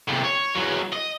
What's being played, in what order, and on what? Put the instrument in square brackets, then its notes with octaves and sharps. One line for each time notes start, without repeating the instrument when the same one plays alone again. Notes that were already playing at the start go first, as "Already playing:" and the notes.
[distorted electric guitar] A2 C3
C#5
E2 F#3
D#5